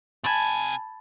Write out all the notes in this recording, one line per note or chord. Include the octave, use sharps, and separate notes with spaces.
C3 G#5 A5 B5 G#6